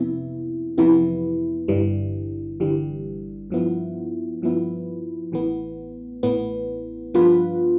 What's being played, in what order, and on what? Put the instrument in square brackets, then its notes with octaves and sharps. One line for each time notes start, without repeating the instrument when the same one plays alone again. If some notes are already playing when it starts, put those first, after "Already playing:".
Already playing: [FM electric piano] F2 C3 E3 B3 E4
F2 C3 E3 B3 E4
G1 G2 E3 G3
G1 G2 E3 G3
G2 F3 B3 E4
G2 F3 B3 E4
A1 A2 E3 B3
A1 A2 E3 B3
G2 F3 B3 F4 B4